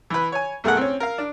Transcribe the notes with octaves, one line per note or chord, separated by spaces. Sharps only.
E3 B4
C#5 G#5
B1 A3 G#4 A#4 F#5
C4 C#4
A#4 F5
D4